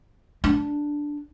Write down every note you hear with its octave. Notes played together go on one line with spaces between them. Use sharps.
D4